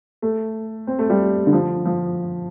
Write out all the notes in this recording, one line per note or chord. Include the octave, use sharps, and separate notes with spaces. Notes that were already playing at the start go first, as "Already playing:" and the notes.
A3
C4
A3
G3
D3
F3
F3